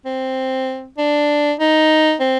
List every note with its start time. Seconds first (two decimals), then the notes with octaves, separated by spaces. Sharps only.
0.05 C4
0.98 D4
1.59 D#4
2.20 C4